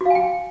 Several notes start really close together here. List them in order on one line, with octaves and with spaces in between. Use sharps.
F#4 F5 G#5 G5